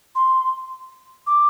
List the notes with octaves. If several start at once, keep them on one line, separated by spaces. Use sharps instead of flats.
C6
D6